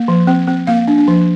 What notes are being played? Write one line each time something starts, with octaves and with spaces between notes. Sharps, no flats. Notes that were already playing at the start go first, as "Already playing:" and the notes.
Already playing: A#3
F3
C4
C4
A#3 F5
D4
D4
F3